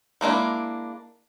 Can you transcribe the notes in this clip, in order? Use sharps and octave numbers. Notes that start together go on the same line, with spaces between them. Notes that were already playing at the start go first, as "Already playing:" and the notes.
G#3 A#3 D4 E4